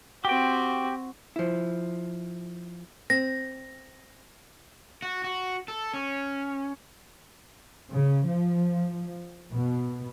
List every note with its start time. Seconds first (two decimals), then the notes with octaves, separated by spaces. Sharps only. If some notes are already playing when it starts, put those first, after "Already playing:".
0.25 C4 F#4 G4 G5
1.36 F3 E4
3.10 C4 A#6
5.02 F#4
5.24 F#4
5.68 A4
5.94 C#4
7.92 C#3
8.26 F3
9.52 B2